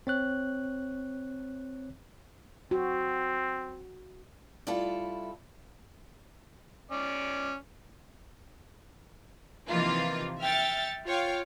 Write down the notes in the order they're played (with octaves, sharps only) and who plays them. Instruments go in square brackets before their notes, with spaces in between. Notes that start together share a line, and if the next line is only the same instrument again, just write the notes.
[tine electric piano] C4 C#5 F#6
[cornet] C4 [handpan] F#4
[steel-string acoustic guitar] G3 A3 E4 F4 A4
[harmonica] C#4 D5
[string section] C3 E3 F3 A#3 D#4 F4
E5 G5 F6 A6 C#7
F4 C#5 F5 G5